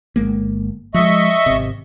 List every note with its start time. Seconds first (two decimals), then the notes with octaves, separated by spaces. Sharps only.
0.16 G1 G#3 A#3
0.94 F3 G#3 D#5 E5 C#6
1.46 G#1 C3